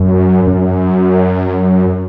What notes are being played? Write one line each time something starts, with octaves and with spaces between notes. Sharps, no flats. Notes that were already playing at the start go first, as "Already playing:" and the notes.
Already playing: F#2
F#2